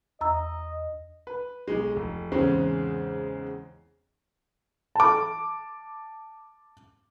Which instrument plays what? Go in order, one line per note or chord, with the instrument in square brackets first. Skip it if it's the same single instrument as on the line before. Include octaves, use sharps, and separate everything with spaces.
[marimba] E2 A#5 E6 [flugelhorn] D#5
[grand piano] B4
B1 G#3
F1
E2 G#2 C#3 G#3 C4 C#4
[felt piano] A5 D6